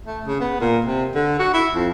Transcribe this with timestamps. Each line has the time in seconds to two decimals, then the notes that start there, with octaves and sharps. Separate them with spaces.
0.06 A3
0.27 C#3
0.40 B3
0.60 A#2
0.85 C3
1.15 D3
1.39 F#4
1.53 E4
1.73 F2